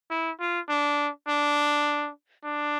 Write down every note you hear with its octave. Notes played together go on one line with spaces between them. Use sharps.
E4
F4
D4
D4
D4